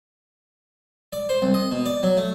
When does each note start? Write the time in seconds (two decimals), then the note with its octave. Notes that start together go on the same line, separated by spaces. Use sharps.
1.13 D5
1.29 C5
1.42 C2
1.54 D#5
1.72 B2
1.85 D5
2.03 F#3
2.17 A3